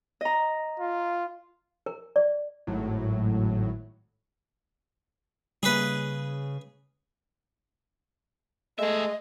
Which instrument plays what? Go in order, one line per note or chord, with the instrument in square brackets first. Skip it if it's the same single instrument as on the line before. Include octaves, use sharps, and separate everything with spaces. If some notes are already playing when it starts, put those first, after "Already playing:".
[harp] D#5 A#5
[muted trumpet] F4
[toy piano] A#4
D5
[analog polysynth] G#1 A2 F#3
[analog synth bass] C#3 [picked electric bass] G3 A#3 [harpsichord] G#4 B4
[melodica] G#3 [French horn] A3 [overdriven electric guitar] G#4 E5 [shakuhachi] D#5